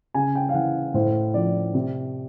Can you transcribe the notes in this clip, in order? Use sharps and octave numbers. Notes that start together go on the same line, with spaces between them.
C#3 G#5
G5
F5
E3 F#5
A2 C5
F3 D5
C3